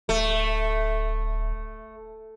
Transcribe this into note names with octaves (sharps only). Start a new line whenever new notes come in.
D1 A3